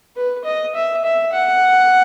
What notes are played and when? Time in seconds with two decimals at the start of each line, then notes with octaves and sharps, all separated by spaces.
0.17 B4
0.45 D#5
0.75 E5
1.04 E5
1.33 F#5